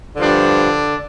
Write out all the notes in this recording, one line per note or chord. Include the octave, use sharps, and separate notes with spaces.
G2 D3 F3 D4